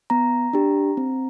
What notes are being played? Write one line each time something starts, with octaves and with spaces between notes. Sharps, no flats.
B3 A#5
D4 G4
C4